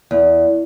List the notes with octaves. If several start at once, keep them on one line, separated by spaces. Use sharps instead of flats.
E2